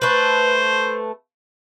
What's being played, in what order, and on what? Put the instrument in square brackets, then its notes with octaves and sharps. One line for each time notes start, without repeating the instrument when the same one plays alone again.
[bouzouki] A3 B4 [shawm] C5